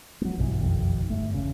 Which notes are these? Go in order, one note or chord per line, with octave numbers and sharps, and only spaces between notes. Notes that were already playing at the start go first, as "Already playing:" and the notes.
F#3 A3
B1 G2 B2 E3
F#1 B1 F2 D#3
G1 E2 A3
E2 C#3